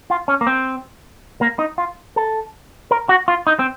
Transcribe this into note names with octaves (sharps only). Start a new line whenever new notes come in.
F4
C#4
A#3
C4
A#3
D#4
F4
A4
A#4
F#4
F4
D#4
C4